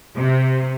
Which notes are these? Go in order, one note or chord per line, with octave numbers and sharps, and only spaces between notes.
C3